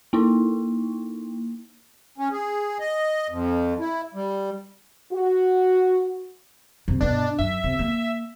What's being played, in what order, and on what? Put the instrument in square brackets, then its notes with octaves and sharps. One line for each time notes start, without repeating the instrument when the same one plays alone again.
[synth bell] A#3 D#4 E4
[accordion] C#4
G#4
D#5
F2
E4
G3
[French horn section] F#4
[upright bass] F#2 C3
[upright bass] G1 B2 [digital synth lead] D4
[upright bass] F#2 [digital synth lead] E5
[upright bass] C3
A#3